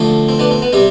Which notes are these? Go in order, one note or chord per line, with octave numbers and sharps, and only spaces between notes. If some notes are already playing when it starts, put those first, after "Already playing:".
Already playing: D2 D3 F3 A3
C4
B3 D4
C4
B3
C3 G3 C4